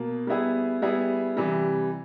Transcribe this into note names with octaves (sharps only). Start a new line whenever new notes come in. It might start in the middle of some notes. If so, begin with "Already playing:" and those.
Already playing: B2 A#3
G3 B3 E4 G#4
G3 B3 E4 G#4
C3 E3 G3